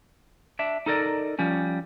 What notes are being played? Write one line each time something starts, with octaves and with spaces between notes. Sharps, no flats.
D4 E5
D#4 A4 A#4 D5
F3 G3 C#4